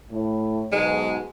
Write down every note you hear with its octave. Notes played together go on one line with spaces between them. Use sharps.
A2
B1 G#2 B2 G#3